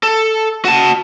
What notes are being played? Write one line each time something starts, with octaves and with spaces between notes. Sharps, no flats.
A4
F#4 A5